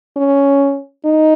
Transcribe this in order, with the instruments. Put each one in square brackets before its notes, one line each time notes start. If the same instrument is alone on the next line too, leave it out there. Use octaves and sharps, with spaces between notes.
[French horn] C#4
D#4